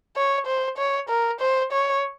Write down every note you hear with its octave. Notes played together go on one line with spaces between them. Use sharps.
C#5
C5
C#5
A#4
C5
C#5